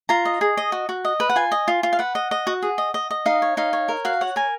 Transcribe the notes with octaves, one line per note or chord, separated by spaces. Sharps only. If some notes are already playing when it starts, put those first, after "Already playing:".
F4 A#5
D#5
G#4
D#5
F#4
F#4
D#5
B4
F#5
F4 G#5
D#5
F4
F4
F5
B4 F#5
D#5
D#5
F#4
G#4
D#5
D#5
D#5
D#4 F5
C#5
D#4 F5
C#5
A#4
F#4 F5
C#5 F#5
A#4 G#5